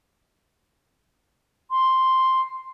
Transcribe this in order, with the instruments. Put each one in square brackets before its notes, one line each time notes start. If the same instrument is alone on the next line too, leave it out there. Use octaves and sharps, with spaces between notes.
[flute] C6